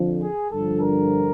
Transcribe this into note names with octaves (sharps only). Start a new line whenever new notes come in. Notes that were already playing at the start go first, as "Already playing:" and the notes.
Already playing: F2 D3 F3
G#4
G2 D3 F3 A4
A#4